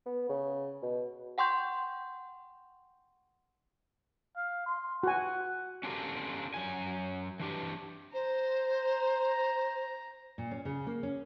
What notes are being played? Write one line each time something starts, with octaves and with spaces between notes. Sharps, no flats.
B3
C#3
B2
F#5 G5 C6 C#6 G6
F5
C6
F#4 F#5 G#5
C#4 D4 F4 G4 A4 A#4
F#2 G#5
E3 D4 G4
C5 A#5
A#2
C#4
C#3
A#3
C#4